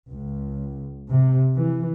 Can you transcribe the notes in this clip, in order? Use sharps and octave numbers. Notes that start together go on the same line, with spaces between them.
C#2
C3
E3